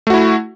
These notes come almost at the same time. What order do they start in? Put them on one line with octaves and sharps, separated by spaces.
A3 F#4 E4